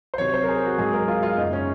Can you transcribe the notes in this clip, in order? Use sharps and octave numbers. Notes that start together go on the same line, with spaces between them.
C5
C3 D#3 F#3 C#5
C5
A#4
G#4
F#4
G#2 F#3 G#4
A#4
F4
F4
F#2 C#3 G#3 D#4
C#4